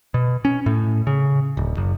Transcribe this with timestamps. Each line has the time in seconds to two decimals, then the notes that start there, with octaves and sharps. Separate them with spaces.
0.14 B2
0.45 C#4
0.66 A2
1.07 C#3
1.57 D1
1.77 F#1